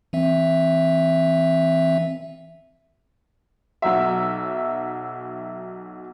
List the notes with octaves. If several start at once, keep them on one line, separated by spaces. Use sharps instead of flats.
E3 C4 E5
B1 F#3 E5